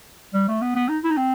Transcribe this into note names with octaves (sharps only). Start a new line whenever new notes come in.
G3
A3
B3
B3
D#4
E4
D#4
C4